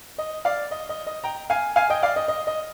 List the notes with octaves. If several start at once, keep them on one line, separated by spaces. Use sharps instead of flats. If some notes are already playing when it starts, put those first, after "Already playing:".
D#5
D5 F5
D#5
D#5
D#5
G5 A#5
F5 G#5
F5 G#5
D#5 G5
D5 F5
D#5
D#5
D#5